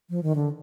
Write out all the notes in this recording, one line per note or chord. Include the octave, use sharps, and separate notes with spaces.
F3
D#3
D3